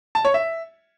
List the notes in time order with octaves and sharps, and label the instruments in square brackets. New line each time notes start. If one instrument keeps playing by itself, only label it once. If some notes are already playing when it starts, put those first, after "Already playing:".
[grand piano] A5
C#5
E5